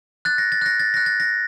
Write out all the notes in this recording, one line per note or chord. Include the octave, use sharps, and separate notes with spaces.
F#6 A6
A#6
A6
F#6 A#6
A6
F#6 A#6
A6
A#6